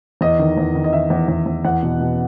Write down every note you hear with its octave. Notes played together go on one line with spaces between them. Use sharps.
E2 D#5
D#3
E2
D#3
D#5
D#3 E5
E2
E2
E2
E2 F#5
B2
B2